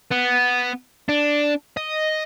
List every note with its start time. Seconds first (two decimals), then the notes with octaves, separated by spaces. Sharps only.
0.11 B3
1.09 D4
1.77 D#5